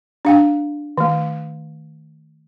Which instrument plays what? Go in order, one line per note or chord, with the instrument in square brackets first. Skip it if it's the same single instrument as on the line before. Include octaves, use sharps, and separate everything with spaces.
[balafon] D4 F5 G5
D#3 A3